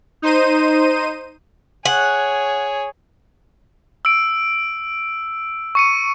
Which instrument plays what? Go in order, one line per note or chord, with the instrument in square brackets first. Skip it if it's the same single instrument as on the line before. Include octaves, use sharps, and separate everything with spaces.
[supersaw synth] D#4 C5 D#7
[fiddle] G#4 C#5 [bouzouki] F#5
[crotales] E6 D7
C#6 C#7 D#7